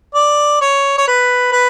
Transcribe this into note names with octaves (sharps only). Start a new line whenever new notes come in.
D5
C#5
C#5
B4
B4